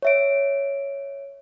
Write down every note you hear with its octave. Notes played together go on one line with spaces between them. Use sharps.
C#5 E5 D7